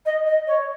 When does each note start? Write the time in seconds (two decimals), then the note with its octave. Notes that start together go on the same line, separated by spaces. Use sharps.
0.05 D#5
0.26 D#5
0.47 C#5